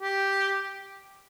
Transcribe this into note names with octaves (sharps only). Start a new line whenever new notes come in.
G4